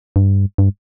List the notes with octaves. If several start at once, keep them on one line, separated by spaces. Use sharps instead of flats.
G2
G2